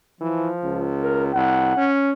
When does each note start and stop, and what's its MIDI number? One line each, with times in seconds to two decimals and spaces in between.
0.21 0.49 52
0.21 0.90 53
0.64 1.30 37
1.01 1.25 70
1.34 1.72 36
1.34 1.89 78
1.77 2.11 61